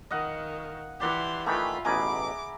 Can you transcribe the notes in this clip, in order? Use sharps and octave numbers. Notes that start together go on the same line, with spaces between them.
D#3 D#5 F5 F#5
E3 G4 D5 F#5 C6
D#3 E3 A3 F4 E5 G#5 B5
A1 B2 G#4 G#5 A#5 B5 D6